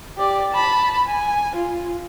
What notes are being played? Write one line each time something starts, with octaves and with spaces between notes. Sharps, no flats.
G4 D5
A5 B5
G#5
F4